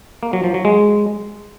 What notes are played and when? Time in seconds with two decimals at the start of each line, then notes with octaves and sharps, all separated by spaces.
0.23 A#3
0.33 F#3
0.44 F3
0.54 F#3
0.65 G#3